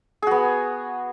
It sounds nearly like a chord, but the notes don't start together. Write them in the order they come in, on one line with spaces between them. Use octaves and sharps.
G#4 F#4 B3